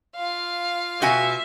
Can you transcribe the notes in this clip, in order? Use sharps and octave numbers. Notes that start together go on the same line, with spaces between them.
F4 F5
B2 F#4 E5 G#5